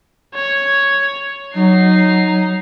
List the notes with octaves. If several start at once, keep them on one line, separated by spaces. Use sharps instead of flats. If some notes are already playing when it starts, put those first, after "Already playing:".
C#5
F#3 D#4 C7